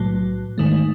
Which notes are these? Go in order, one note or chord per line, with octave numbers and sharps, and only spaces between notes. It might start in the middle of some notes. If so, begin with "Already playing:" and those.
Already playing: B1 A2 F#3
G#2 D#3 A3